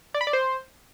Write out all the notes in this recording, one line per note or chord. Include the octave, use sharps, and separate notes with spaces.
D5
B5
D5
C5